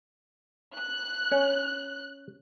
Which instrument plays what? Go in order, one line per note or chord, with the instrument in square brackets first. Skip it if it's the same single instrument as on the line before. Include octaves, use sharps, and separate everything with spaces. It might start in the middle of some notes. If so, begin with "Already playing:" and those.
[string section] F#6
[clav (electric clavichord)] C#4 C#5